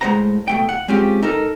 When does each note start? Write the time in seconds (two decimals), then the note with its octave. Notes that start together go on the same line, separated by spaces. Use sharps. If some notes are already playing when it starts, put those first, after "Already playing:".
0.01 A2 G#3 C#4 C5 F#5 A#5
0.48 B2 A3 G5
0.69 F#5
0.88 G#3 C4 C#4 F4 G4
1.23 D#4 A4 A#4